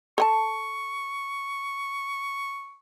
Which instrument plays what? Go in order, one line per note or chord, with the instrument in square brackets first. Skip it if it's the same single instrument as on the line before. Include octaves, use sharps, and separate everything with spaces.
[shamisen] A4 F#5 A5 [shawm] C#6